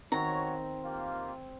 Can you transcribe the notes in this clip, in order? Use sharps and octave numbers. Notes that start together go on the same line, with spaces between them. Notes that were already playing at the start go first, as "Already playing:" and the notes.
D#3 C4 F#4 C#5 A#5
A#3 F4 G4